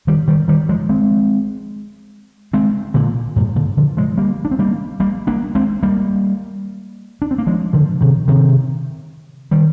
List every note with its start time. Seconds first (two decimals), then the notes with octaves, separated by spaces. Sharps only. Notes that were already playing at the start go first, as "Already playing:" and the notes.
0.07 D#3 G3
0.28 D#3 G3
0.48 D#3 G3
0.69 F3 G#3
0.89 G#3 C4
2.53 G#3 C4
2.94 A#2 D3
3.36 G2 A#2
3.56 A#2 D3
3.77 D3 F3
3.97 F3 G#3
4.17 G3 A#3
4.45 D4
4.51 C4
4.59 G3 A#3
5.00 G3 A#3
5.27 A#3 D4
5.55 G#3 C4
5.83 G3 A#3
7.22 D4
7.31 C4
7.38 A#3
7.47 F3 G#3
7.73 D3 F3
8.01 C3 D#3
8.28 C3 D#3
9.51 D#3 G3